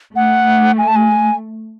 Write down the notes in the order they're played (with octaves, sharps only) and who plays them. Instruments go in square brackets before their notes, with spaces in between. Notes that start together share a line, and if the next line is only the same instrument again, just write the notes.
[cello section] A3 [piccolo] F#5
[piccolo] G#5
A5
G#5